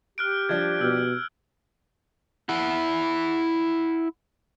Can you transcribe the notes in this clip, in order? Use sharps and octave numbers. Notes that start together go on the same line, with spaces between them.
G4 F6 F#6 D7
F3 G3 D4 G#6
B2 E6 F6
E4 F#5